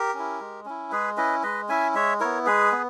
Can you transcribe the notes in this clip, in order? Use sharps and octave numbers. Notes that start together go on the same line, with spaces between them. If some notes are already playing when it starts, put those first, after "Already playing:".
Already playing: G4 A#4
C#4 E4
G#3
C#4 E4
G#3 G#4 B4
C#4 E4 B4 D#5
G#3 B4 D#5
C#4 E4 E5 G#5
G#3 C#5 E5
B3 E4 A#4 C#5
G#3 G#4 B4
B3